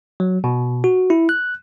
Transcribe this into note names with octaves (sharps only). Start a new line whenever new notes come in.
F#3
B2
F#4
E4
F#6